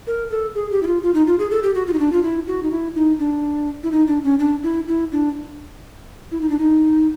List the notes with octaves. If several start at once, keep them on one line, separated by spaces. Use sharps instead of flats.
A#4
A4
G#4
G4
E4
F4
F4
D#4
F4
G#4
A4
G4
F#4
F4
D#4
D4
F4
E4
F#4
D#4
E4
D#4
D4
E4
D#4
D4
C#4
D4
E4
E4
D4
E4
D#4
D4
D#4